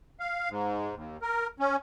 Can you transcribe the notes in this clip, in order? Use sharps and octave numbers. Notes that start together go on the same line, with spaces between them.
F5
G#2
D#2
A#4
C#4